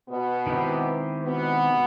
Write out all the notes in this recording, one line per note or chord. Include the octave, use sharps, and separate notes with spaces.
B2 B3
D#3 G#3 C4 E4 G4
B2 B3